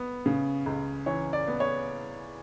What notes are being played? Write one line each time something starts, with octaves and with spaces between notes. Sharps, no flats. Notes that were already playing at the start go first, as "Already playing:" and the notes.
Already playing: B3
C#3
C#2
E3 C#5
D5
B3
C#5